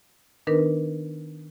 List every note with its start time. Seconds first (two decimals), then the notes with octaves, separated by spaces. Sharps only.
0.47 D#3 B3 D4 D#4 A#4 B4